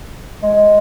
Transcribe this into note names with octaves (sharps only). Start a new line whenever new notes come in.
G#3